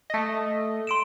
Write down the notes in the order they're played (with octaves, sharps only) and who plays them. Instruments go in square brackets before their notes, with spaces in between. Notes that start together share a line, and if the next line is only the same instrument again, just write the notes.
[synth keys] A3 D#5
[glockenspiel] C6 D7 E7